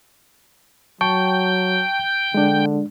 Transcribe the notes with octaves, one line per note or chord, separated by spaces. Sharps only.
F#3 G5 A5 C#6
D3 G#3 D4